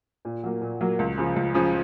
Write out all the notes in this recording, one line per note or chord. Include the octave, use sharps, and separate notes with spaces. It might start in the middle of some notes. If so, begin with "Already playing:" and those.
A#2
F#3 A#3
A#2
F#3 A#3
C#2
C#3 F3
C#2
C#3 F3